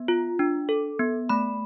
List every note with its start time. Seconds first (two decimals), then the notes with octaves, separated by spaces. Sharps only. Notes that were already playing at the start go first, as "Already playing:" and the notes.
Already playing: B3
0.08 F4
0.39 D4
0.69 A4
0.99 B3
1.29 A3 B5